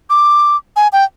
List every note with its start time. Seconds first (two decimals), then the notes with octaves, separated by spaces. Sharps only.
0.10 D6
0.76 G#5
0.93 G5